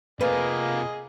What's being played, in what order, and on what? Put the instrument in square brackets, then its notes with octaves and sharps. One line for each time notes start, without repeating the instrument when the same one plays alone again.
[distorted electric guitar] C3 F4 [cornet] A#3 [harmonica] G#4 D#5 [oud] B4